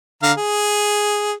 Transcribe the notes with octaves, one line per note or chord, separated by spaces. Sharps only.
D3 F5 A#5
G#4